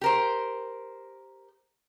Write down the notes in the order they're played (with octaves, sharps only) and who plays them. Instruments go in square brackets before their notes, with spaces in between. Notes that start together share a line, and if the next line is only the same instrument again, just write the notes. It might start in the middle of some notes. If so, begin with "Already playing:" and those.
[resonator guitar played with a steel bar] G4 A#4 C5